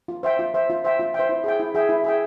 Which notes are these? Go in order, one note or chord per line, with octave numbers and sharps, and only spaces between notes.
F4
C5 E5 G5
F4
C5 E5 G5
F4
C5 E5 G5
F4
C5 E5 G5
E4
G#4 E5 G5
E4
G#4 E5 G5
E4
G#4 E5 G5